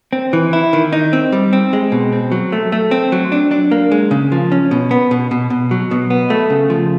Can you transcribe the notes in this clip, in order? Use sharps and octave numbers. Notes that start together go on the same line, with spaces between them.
C4
E3
E4
D#3
D#4
C4
G3
C4
G#3
B2
C4
F#3
A3
A3
C4
F#3
D4
D4
A#3
G#3
C#3
F3
C#4
B2
B3
B2
B2
B2
F#3
B2
B3
A3
C#3
F3